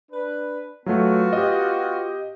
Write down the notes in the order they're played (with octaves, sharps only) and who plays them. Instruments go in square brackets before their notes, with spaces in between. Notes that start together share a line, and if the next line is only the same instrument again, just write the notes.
[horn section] D4 B4
[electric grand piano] F#3 A3 [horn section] B3 F4 F#4
[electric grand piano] G4 D#5